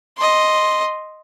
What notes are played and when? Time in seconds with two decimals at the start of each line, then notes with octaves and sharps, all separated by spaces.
0.17 D#5 C6